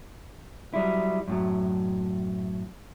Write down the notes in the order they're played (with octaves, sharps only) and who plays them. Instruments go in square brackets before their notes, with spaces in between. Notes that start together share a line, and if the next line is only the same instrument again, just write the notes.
[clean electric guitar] F#3 G3 E4
F#2 A2 F#3